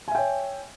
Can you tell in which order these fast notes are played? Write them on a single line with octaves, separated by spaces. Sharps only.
G#5 E5 G5 C#5